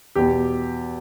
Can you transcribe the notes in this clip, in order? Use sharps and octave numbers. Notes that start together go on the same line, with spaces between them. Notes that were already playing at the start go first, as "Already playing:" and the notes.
E2 B2 G4